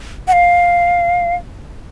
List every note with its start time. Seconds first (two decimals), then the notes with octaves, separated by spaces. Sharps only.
0.28 F#5
0.33 F5